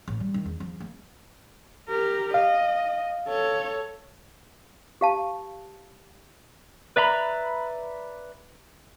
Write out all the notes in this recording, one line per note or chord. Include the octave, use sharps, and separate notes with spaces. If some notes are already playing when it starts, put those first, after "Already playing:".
A1
G3
D#3
E2
F3
A#3
G4 A#4
D#5 F5
A4 C#5
G4 F5 A5
B4 D5 E5 A#5 B5